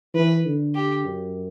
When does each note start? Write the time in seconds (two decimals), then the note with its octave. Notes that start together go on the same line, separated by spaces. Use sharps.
0.15 E3 B4
0.46 D3
0.75 G4
1.05 F#2